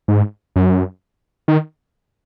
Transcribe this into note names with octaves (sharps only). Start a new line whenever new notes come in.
G#2
F#2
D#3